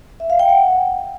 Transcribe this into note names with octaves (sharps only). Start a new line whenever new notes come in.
E5
F5
G5
F#5